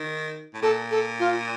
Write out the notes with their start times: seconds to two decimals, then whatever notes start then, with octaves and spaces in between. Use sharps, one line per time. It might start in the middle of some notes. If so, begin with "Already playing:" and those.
Already playing: D#3
0.54 A2
0.62 A#2 A4
0.91 A4
1.20 F4